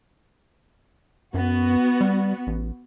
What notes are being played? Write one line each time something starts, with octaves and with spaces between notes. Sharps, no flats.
F#2 B3 F#4
G3
A1